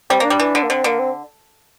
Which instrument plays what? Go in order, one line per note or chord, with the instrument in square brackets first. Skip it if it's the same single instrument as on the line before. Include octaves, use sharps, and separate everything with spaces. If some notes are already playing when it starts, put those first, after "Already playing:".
[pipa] G3 [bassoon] C4
[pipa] A#3 [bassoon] D4
[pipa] G3
E3
D3
[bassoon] A#3
[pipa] D3 [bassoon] C4
[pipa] D3 [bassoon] A#3
[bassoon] C4